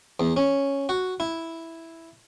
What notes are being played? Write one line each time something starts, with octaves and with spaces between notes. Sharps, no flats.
E2
C#4
F#4
E4